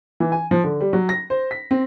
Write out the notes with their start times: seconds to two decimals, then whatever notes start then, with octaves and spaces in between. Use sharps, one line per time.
0.20 E3
0.32 G#5
0.51 F3
0.64 D3
0.81 G3
0.93 F#3
1.09 A#6
1.30 C5
1.51 B6
1.71 C4